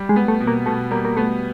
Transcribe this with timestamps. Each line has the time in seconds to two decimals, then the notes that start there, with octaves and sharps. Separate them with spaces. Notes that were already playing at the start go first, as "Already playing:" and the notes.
Already playing: G3
0.09 G#3
0.16 B3
0.28 A3
0.41 B2
0.47 A#3
0.66 B2 A3
0.91 G3 A#3
1.05 A#3
1.17 A3 B3